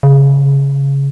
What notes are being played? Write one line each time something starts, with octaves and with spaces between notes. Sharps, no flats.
C#3